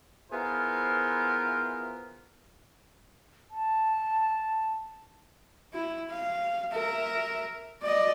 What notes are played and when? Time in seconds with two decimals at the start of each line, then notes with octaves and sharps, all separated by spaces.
0.31 B3 E4 F4 G#4 A#4 C5
3.51 A5
5.73 E4
6.11 F5
6.72 A#4 E5
7.82 D5 D#5